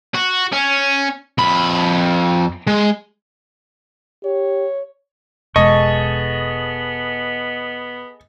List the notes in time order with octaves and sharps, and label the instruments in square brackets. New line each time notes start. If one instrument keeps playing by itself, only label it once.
[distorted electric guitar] F#4
C#4
F2 B5
G#3
[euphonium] G4 [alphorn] C#5
[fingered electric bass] E1 G#3 [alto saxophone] B3 [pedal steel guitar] G#4 A4 C#6 [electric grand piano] D#5